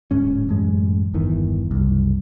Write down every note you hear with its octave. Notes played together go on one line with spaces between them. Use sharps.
D1 G#2 C#4
A1 F#2 G#3
G1 E2 D#3 E3
F#1 C2